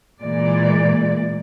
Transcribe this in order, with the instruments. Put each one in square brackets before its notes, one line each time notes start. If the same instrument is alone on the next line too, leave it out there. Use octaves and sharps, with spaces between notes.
[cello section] A#2 E3 G#3 D5